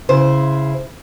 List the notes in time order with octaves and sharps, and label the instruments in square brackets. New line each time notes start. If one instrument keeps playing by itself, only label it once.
[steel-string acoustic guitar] C#3 E4 C5